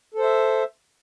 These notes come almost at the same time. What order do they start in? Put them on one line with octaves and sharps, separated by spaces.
A4 C5 E5